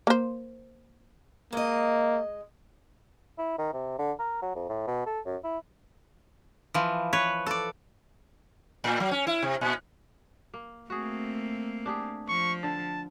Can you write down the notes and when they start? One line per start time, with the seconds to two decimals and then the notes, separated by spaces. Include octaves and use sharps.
0.07 A#3 C5
1.53 G#3 A#3 D#5
3.38 E4
3.59 D#3
3.73 C3
3.99 D3
4.19 A#4
4.42 F#3
4.55 F2
4.69 A2
4.87 B2
5.06 A4
5.25 F#2
5.44 E4
6.74 E3 F3
7.13 B4 C#5
7.46 A4 D5
8.84 A2
9.00 F#3
9.11 C#4
9.27 E4
9.42 C3
9.61 A#2
10.54 A#3
10.90 A3 A#3 C4 F#4 G#4
11.86 D4 G4 G#4
12.28 F3 C#6
12.63 D3 A5